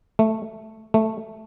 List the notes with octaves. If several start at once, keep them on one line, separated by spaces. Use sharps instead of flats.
A3
A3